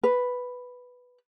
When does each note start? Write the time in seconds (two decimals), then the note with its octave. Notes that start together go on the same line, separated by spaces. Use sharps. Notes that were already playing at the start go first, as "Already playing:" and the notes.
0.04 B4